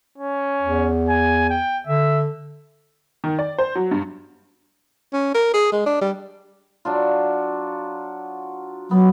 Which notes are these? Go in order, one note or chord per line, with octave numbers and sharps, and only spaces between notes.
C#4
E2
G#5
G5
D3 E5
D#3
D5
C5
F#3
G2
C#4
A#4
G#4
G#3
D4
G3
F#3 D4 F4
F#3 B3